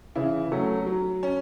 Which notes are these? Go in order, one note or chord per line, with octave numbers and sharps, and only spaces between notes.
C#3 E3 E4
F#3 A3 C#4
F#3
C#4